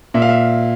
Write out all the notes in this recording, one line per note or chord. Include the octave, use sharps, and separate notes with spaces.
A#2 E5
F5
E5